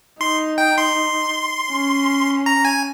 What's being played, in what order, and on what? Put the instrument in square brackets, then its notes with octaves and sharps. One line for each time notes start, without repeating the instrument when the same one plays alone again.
[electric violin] D#4 [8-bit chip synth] C6
[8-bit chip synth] G5
C6
[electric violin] C#4
[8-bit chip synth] A#5
G#5